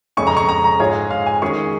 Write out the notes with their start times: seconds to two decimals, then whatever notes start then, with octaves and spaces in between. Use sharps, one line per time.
0.17 F2 C#3 G#3 C#4 C#6
0.27 A#5
0.37 C#6
0.49 A#5
0.64 A#5
0.80 G#2 G#3 F4 G#4 C#5
1.11 F5
1.26 G#5
1.42 D#3 G#3 C#4 G#4 C#6